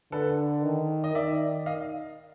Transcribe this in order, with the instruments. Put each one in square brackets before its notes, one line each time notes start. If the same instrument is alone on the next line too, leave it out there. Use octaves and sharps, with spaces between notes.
[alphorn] D3 [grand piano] A4 B4
[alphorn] D#3
[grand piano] D#5
[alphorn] D#3 [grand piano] D5 E5
[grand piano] D#5 F5